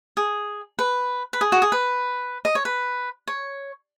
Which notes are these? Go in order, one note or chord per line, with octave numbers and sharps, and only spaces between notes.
G#4
B4
B4
G#4
F#4
G#4
B4
D#5
C#5
B4
C#5